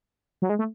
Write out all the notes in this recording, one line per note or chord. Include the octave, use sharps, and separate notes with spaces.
F#3
G#3
A3